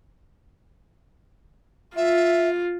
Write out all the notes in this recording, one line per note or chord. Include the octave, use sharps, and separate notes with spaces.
F4 E5